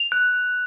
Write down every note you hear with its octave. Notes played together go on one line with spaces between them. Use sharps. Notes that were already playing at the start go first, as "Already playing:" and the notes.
Already playing: F7
F#6